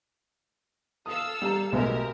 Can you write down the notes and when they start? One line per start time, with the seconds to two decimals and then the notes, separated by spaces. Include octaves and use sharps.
1.06 A4 F5 D#6 E6
1.42 G3 A#5
1.72 B1 G#3 A3 G4 A#4